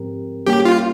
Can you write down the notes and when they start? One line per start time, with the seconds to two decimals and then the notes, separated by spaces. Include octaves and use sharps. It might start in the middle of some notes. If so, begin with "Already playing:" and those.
Already playing: G#2 F3 C4 G4 A#4
0.47 G3 A#3 C#4 G4
0.65 F4